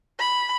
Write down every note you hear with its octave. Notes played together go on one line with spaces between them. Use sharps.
B5